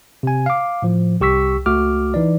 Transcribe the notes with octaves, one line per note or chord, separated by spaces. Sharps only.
C3 G#5
F5 D6
A2 F3
C2 G4 C#6 E6 B6
C#2 A3 F#4 D6 F6
E3 D#4 D5